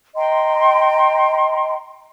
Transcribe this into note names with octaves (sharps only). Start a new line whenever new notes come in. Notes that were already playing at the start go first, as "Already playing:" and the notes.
D#5 G5 A#5 C6